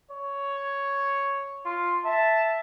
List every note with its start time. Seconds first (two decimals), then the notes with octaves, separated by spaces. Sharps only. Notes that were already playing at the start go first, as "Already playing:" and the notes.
0.11 C#5
1.65 F4
2.05 E5 A5